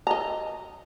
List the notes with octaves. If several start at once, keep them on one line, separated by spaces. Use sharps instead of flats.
D#5 A#5